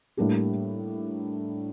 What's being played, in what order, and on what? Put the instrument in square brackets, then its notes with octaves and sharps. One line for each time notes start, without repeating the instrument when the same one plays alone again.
[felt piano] A2 G3 A#3 D4 G4